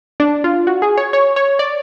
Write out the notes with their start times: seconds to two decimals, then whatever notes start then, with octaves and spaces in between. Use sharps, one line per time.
0.20 D4
0.44 F4
0.67 F#4
0.82 G#4
0.98 C#5
1.13 C#5
1.36 C#5
1.59 D5